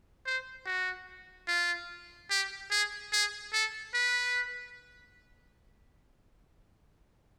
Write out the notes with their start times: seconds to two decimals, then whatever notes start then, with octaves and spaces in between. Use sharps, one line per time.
0.26 C5
0.66 F#4
1.47 F4
2.30 G4
2.71 G#4
3.12 G#4
3.53 A4
3.94 B4